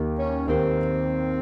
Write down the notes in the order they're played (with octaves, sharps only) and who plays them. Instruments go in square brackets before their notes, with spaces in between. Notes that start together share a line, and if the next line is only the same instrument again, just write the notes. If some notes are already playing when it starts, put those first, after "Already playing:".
Already playing: [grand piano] D#2 D#3 A#3 D#4 G4
[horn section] C#4
[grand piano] D#2 D#3 A#3 D#4 G4 [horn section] C4